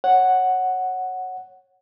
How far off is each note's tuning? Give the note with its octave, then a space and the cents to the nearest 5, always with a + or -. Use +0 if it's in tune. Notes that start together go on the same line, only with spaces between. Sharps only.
C#5 -15 F#5 +0